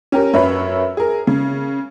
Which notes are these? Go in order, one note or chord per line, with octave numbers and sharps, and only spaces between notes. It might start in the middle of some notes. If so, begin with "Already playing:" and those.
C#4 G4 A#4
F#2 B4 C#5 E5 B5
G#4 A#4
C#3